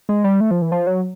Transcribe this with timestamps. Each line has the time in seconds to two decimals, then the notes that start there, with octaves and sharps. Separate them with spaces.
0.09 G#3
0.24 G3
0.40 A3
0.51 F3
0.62 E3
0.72 F3
0.87 F#3